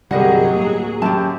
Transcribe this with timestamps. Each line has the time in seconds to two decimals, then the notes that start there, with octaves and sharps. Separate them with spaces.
0.11 G1 C2 F#3 G3 G#4 A#4 D#5 F#5
0.51 D1 A#3
1.02 F#2 G4 A5